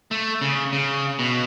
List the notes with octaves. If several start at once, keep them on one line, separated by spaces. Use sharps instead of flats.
A3
C#3
C#3
B2